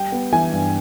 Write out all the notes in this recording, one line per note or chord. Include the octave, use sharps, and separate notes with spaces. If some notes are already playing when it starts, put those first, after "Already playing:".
Already playing: G3 G5
B3
E3 G#5
G2